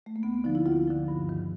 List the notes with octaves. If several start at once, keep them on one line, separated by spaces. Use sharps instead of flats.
A3
A#3
D2 B3
C4
D3 F3 D#4
E4
D2 F4
D3 F3
G2
D#3